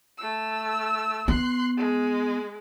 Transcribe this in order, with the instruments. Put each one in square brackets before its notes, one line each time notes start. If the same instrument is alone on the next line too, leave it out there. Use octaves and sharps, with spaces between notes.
[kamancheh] A3 E6
[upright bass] B3 [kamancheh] C6 F#6
[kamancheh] G#3